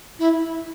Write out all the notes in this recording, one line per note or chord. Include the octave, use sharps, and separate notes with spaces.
E4